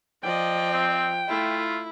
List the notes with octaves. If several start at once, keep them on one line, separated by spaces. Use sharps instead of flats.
F3 D5 D#5 G5
C4
A3 E4 F4